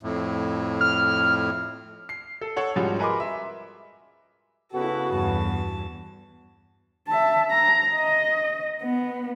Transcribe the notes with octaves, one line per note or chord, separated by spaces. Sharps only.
F2 A2
F6
C7
A4
A4 C#5 F#5
G#2 F3 G3 G#3 C#4 F#4
G#4 A#4 B4 D#5 C6 D6
E5
C#3 B3 E4 F#4 A4
E2 G2 A5
E5 A5
A#5
D#5
B3